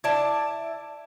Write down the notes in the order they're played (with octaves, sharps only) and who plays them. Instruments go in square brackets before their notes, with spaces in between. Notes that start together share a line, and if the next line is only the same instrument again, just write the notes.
[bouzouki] E4 D5 A5